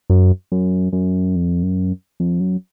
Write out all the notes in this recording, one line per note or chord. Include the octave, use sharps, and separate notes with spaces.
F#2
F#2
F#2
F2
F#2
F2
F#2